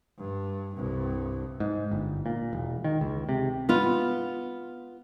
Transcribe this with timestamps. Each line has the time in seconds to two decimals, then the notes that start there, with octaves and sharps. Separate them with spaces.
0.19 G2
0.76 C2 G2
1.60 G#2
1.91 G1
2.26 A#2
2.53 E1
2.84 D#3
3.01 C#2
3.29 C3
3.69 B3 F4